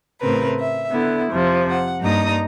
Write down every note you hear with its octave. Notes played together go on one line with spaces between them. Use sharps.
A2 C#3 C4 A#4 B4
E5
D3 B3 E4
F2 C3 F3
F#5
G2 A#3 D#4 A#5 D#6